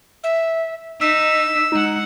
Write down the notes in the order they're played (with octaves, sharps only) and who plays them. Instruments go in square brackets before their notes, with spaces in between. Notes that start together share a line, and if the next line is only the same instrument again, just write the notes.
[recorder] E5
[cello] D#4 [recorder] E6 [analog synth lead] B6
[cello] G#3 F#5 [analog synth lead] D#4